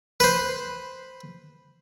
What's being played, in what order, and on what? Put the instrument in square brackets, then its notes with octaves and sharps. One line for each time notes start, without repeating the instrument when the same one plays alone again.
[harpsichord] B4 C5